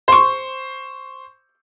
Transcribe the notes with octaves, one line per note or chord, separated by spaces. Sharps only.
C5 C#6